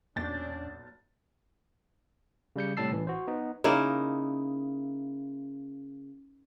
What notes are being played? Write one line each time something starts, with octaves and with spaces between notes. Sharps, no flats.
B1 E2 A#2 C#4 D4 G6 A6
C#3 G3 G6 C#7
A2 C3 G3 A5 E6 C7
A1 E3
F#4 C5
B3 D#4
C#3 A#3 D#4 E4